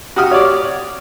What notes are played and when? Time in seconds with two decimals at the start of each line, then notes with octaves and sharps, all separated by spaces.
0.16 F#4 G4 D#6 F6
0.31 C#5 D5